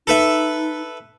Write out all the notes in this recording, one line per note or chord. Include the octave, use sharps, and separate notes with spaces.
D#4 A4 B4 E5